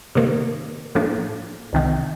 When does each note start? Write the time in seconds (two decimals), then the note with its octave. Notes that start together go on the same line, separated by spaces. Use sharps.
0.15 C3 D#3 A#3
0.95 A2 F3 A#3 D4
1.73 C2 C3 D#3